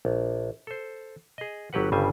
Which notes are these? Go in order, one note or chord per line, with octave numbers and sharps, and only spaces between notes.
A#1
A4 C5
G#4 D#5
G1 F#3 G4 B4 F#5
G1 G2 C#3 G3 C5 G#5